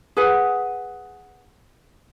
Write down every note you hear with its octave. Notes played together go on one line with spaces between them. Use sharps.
G#4 B4 F#5